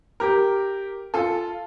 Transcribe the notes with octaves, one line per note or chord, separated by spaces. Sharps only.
G4 A#4
F4 A4